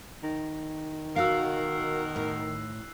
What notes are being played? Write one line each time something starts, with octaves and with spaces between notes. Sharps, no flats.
D#3
B2 F#4 A#4 F5 E6 F#6 C7
A2